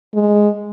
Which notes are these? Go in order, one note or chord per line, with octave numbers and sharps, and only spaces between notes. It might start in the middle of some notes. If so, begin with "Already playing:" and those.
G#3